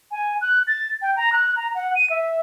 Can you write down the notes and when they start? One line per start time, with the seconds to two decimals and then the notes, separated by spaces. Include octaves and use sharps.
0.11 G#5
0.41 F#6
0.67 A6
1.02 G5
1.17 A#5
1.32 F#6
1.56 A#5
1.75 F#5
1.96 D#7
2.10 E5